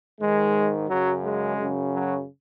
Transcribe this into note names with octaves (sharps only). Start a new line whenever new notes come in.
G#2 D#3 G#3
F#2 C#3 F#3
G#3
F#2 C#3
F#3